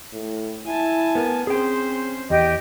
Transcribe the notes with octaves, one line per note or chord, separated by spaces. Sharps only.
A2
E4 G#5 A5
B3 A#4
C4 C#4 G#4 C5 G5
E2 G4 D#5 G5